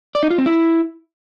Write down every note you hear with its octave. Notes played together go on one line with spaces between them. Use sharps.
D5
D#4
F4
C4
E4